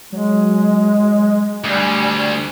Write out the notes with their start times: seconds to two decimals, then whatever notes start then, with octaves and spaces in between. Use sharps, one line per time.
0.12 F#3 G#3
1.64 D2 G3 G#5